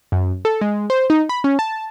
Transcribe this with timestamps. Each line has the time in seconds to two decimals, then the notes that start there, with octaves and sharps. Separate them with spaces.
0.12 F#2
0.45 A4
0.61 G#3
0.90 C5
1.10 D#4
1.29 B5
1.44 C#4
1.59 A5